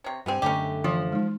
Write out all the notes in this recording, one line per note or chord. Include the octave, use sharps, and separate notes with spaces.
C3 C#5
G2 B3 C4 G4 G#5
F#2 D3 A3 C#4 D#4 G4
E3 F3
G#3 D#4